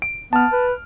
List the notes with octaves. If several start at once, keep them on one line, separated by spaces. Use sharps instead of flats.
D7
B3 A5 F6
B4